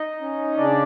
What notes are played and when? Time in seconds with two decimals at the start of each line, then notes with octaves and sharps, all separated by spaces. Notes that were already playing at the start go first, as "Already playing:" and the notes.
Already playing: D#4 D#5
0.21 C#4
0.57 C#3 D4 D5